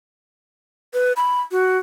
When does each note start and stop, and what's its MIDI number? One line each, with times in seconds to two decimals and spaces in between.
0.94 1.13 71
1.16 1.41 83
1.52 1.77 66